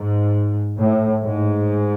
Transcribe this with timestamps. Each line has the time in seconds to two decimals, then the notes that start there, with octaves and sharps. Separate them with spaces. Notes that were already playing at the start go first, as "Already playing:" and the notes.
Already playing: G#2
0.80 A2
1.24 G#2